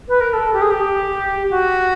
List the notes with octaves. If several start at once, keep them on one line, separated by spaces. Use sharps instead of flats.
B4
A#4
A4
G4
G#4
G4
F#4